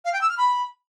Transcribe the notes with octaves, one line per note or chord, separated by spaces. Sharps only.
F5
G5
E6
F6
B5